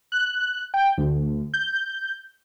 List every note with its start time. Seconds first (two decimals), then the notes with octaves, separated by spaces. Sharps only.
0.12 F#6
0.74 G5
0.98 D2
1.54 G6